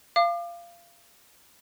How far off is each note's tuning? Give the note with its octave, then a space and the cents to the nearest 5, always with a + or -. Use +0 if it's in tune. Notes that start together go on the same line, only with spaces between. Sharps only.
F5 -20 D6 +35